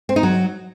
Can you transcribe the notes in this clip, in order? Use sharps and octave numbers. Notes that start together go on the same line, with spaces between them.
C4
D#4
F#3